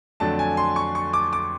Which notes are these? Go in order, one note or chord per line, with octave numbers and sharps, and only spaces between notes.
F2 D3 F#3 A3 D4 A5
G#5
C6
C#6
C#6
D6
D6